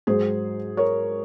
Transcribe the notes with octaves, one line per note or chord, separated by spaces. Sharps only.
G#2 F#3 G#4 C5
A#4 C#5